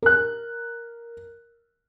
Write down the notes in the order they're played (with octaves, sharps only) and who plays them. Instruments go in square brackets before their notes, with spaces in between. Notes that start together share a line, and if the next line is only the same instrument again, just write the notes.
[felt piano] A#4 F#6